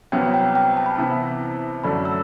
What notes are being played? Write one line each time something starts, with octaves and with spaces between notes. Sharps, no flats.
C2 C3 F#3 B3 G5
G5
G5
A5
B5
C3 E3 B3 E4 A5
F#2 D3 F#3 A3 D4 B5
E6